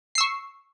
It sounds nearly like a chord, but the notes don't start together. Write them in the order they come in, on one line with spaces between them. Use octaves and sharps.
C7 E6 C#6